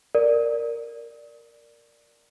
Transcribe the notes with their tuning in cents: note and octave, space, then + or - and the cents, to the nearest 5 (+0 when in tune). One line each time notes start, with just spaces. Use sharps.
A#4 +0 D5 +0